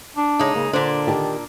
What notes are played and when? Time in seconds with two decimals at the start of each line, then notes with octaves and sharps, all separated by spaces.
0.16 D4
0.39 C#3 G#3 D#4
0.55 C#3 A#3
0.73 A#2 D3 D4 C5
1.07 D#3 G4 A5